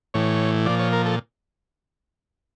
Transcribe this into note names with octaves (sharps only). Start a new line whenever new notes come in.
A2 E3 C#5
A#2 F3 D5
C#5
A#4
A4